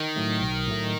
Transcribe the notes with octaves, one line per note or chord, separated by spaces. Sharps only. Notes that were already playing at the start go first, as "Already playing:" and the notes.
Already playing: D#3
A2 F#3 A3
B1
A2 F#3 A3